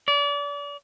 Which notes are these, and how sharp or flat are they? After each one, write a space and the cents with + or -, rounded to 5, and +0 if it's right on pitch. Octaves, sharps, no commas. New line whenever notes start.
D5 -35